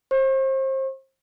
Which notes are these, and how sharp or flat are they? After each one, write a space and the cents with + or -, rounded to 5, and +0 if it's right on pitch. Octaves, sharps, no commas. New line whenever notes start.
C5 +30 C#6 -40